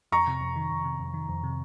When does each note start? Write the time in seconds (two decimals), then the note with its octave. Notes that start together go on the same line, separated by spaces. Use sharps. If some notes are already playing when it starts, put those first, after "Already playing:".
0.12 F2 A#5 C#6
0.27 C3
0.41 F2
0.56 D#3
0.70 F2
0.85 C3
0.99 F2
1.14 D#3
1.29 F2
1.44 C3